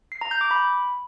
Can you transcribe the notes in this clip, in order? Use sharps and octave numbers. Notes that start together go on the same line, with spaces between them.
C7
A#5
G6
D6
B5